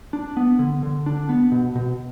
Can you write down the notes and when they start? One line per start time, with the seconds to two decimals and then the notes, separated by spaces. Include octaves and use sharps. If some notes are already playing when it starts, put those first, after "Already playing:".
0.13 D4
0.37 B3
0.59 D3
0.83 D3
1.06 D4
1.29 B3
1.52 B2
1.75 B2